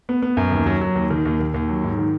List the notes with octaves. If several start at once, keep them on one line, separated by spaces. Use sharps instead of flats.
B3
B3
F#2
D#2
F#3
F#3
D#2
D#3
D#2
D#2
D#2
F#3
G#2
D#3